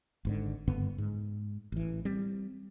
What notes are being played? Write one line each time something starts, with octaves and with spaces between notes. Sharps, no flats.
G#1 G#2 D3
F#1 G2 D3 B3
G#2
A1 E3
G3 C4